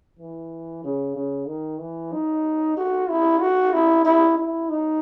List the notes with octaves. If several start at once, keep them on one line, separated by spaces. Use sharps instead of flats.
E3
C#3
C#3
D#3
E3
D#4
F#4
E4
F#4
E4
E4
E4
D#4